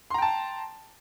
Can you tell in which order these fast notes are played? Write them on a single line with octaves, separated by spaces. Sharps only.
C6 A#5 G5 A5